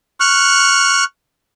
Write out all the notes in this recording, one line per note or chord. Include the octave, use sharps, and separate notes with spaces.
C#6 F6 F#6